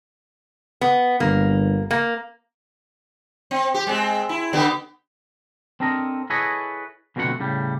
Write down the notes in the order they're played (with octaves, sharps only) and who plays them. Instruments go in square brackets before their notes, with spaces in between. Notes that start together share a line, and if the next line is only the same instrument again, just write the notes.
[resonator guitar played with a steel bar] B3
[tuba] G1 [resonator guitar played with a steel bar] A#3
[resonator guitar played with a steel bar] A#3
[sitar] C4
G4
G#3 C4
E4
D3 B3 G4
[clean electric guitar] C4 D4 A4 A#4 D#5
E4 G#4 A4 B4 C#5 D#5
F2 B2 D3 A3 G4 F#5
A2 C#3 G3